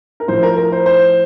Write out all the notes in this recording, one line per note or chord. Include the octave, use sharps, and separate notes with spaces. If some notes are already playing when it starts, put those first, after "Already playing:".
A#4
A2 F3 C5
A#4
A#4
C5
C5